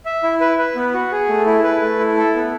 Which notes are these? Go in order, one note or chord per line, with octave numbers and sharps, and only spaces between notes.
E5
E4
B4
B4
B3
F#4
G#4
A3
E4
B4
A3
E4
A4
B3